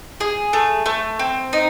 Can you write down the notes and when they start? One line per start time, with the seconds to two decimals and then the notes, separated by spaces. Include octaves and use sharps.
0.20 G#4
0.53 A3
0.86 A3
1.19 C4
1.53 D#4